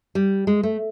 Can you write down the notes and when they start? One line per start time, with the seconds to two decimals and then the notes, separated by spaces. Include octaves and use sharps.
0.15 G3
0.47 G#3
0.63 A3